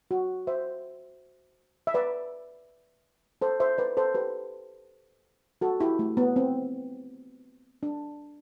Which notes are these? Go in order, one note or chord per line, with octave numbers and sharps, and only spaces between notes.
F#4
C5 E5
E5
B4 D5
A4 C5
C5 E5
B4 D5
A4 C5
G4 B4
F#4 A4
E4 G4
A3
B3
C4
D4